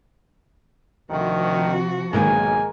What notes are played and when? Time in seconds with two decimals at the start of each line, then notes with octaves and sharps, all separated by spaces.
1.10 D2 C3 D#3 F3 F#4
2.13 B1 G#2 D#3 G#3 A#3 A#4 G#5